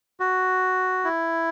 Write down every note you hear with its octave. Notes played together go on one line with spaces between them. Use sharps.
F#4
E4